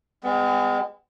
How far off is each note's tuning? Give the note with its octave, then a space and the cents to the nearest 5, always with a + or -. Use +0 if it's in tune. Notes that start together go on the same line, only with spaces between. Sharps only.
G#3 -35 B3 +35